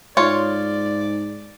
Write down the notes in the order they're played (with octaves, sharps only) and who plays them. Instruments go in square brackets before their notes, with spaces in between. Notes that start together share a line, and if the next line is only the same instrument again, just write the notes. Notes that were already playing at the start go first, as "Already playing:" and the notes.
[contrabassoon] G#2 [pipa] F4 [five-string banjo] C#5 [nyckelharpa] D5